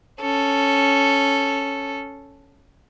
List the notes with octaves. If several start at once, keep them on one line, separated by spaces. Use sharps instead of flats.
C#4 A4